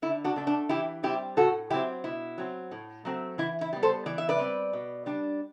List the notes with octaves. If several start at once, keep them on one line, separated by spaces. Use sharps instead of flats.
D3 E4
D4 F#4
A3 D4
D4
E3 E4 G4
G3 C4 E4 G4
A2 F#4 A4
F#3 C4 E4 G4
B2 E4
F#3 C4
A2
F#3 A3 C4
E3 E4
E4
G3 B3
A4 C5
E3 D5
E5
B4 D5
G3 C4
B2
G3 D4